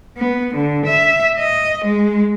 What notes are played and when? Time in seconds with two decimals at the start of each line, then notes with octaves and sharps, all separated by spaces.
0.18 B3
0.55 D3
0.86 E5
1.39 D#5
1.85 G#3